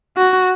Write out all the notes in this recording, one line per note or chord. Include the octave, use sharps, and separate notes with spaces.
F#4